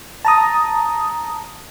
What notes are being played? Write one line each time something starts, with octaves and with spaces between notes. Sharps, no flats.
A5 A#5 D#6